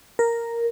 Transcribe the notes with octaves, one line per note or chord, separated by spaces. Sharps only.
A#4